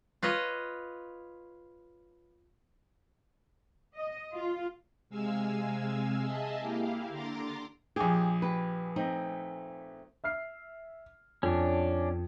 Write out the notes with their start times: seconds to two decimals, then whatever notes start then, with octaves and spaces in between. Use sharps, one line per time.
0.23 F4 B4 C#5 D#5
3.96 D#5
4.34 F4
5.09 C3 G#3 F5 G#5 E6
6.22 G#4 D#5 E5 G#5 A5
6.60 A#3 E4 G4 F5
7.09 D3 A#5 C6 D6 A6
7.96 A#1 G4 G#4
8.42 G4 B4
8.96 A3 C4 D#4
10.24 E5 F6 C7
11.43 F2 C#4 D4